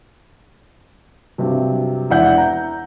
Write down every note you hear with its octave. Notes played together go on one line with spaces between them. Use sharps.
G2 C3 F#3
E1 E4 D5 F#5 G6
A#5